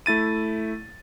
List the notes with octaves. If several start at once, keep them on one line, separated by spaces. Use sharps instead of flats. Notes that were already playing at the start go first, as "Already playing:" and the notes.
A3 E4 A6 D#7